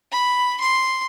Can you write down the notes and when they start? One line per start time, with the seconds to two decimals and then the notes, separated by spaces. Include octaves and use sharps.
0.12 B5
0.61 C6